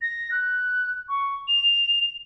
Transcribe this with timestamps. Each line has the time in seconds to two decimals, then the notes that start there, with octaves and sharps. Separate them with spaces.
0.02 A#6
0.31 F#6
1.09 C#6
1.48 F7